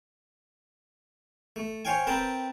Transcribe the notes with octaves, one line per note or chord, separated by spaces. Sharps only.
A3
C5 C#5 F5 G5 G#5
C4 A#4 B4 G5 A5